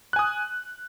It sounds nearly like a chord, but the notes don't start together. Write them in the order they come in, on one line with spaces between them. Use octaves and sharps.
F#6 G#5 D#6